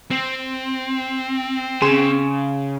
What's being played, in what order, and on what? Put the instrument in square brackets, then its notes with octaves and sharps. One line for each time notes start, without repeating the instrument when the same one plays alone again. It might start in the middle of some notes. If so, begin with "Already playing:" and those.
[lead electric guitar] C4
[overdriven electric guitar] C#3 [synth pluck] G#4 C6 E7